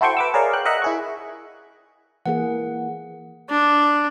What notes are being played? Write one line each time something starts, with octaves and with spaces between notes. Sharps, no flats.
E4 F#4 A4 C5 G5 C#6
B4 D6 E6
G#4 A#4 C#5 D5 F5
G5 F#6
A#4 D#5 E5 F#5 F#6
E4 G#4 C#6
E3 A#3 G#4 F#5
D4